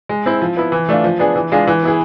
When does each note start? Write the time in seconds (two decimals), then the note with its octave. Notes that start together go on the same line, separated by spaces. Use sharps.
0.09 G#3
0.26 C4 E4
0.42 F3
0.57 B3 E4
0.72 E3
0.89 A3 D4 F4
1.04 F3
1.19 B3 D4 G#4
1.36 E3
1.52 G#3 D4 F4 G#4
1.67 E3
1.83 B3 E4 G#4